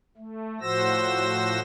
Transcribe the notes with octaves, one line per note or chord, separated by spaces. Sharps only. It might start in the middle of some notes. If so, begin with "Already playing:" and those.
A3
A2 F3 F#4 C5 E6 A#6